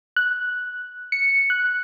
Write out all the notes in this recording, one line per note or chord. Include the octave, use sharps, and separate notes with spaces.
F#6
C#7
F#6